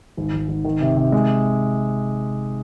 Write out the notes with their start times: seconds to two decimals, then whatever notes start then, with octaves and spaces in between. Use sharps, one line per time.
0.17 G#1
0.33 G#1
0.49 G#1
0.64 D#3
0.81 C3
0.97 C3
1.12 G#3